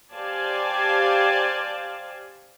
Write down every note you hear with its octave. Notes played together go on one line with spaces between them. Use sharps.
G4 C5 D5 F5 G#5 A5